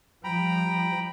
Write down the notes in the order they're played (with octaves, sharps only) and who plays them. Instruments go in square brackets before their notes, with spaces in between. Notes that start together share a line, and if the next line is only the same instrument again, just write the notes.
[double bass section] F3 G3 [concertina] G5 A#5 B5